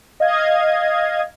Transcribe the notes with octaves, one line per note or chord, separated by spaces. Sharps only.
D#5 F5 G#6